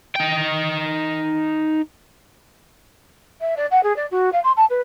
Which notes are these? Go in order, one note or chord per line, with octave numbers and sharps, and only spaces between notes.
D#4 G5
E5
D5
F#5
G#4
D5
F#4
F5
C6
A5
B4